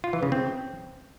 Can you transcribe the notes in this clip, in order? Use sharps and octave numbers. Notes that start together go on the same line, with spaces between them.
F4
E3
C#3
C4